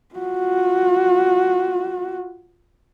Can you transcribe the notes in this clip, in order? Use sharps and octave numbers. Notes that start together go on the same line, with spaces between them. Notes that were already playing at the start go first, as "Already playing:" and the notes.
F4 F#4